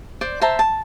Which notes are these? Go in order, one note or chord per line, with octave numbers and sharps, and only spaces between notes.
C5 D5
C5 E5 A5 A#5
A5